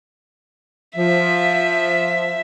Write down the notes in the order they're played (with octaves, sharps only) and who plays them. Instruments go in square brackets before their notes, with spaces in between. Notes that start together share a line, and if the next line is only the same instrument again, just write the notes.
[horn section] F3 [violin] E5